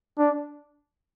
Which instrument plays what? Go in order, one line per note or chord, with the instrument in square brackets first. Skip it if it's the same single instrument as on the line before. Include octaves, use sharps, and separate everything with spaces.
[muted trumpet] D4